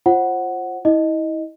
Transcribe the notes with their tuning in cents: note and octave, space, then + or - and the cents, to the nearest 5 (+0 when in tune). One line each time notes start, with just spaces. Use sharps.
F4 -10 C5 +30 F#5 +0
E4 -30 D#5 +0